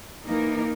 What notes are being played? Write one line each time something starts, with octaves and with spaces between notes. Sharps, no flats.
E3 A#3 D#4 A#4